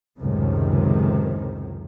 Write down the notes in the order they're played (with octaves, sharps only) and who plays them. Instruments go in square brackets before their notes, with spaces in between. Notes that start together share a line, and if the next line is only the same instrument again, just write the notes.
[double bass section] C#2 F#2 A2 C3 D#3